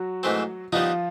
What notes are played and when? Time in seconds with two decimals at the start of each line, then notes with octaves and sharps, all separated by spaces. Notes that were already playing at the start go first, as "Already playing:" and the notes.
Already playing: F#3 F#4
0.23 G#2 E3 A3 C4
0.72 D#3 F3 G3 B3 D#4 F4